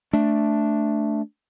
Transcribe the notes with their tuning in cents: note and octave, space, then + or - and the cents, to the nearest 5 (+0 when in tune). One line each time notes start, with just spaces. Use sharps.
A3 +0 D4 +0